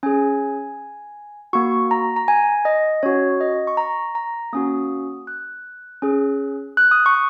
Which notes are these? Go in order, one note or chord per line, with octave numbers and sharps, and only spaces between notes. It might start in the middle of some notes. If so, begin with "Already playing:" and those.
C#4 G#4 G#5
A#3 F#4 C#6
A#5
A#5
G#5
D#5
C#4 F#4 C#5
D#5
C#6
A#5
A#5
A#3 C#4 F#4 D#6
F#6
C#4 G#4
F#6
D#6
C#6